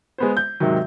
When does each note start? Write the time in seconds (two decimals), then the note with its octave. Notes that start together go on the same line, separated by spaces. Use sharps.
0.18 G#3 B3 C5
0.37 G6
0.60 G#2 C3 D#3 F#3